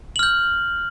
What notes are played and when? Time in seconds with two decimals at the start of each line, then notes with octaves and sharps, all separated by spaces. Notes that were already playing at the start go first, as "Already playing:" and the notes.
0.16 F#7
0.19 F6
0.23 G6